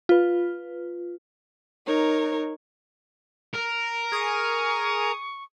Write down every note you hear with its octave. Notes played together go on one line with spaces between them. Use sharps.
F4 B4
D#4 A#4 C#5
A#4
G#4 C#6 D#6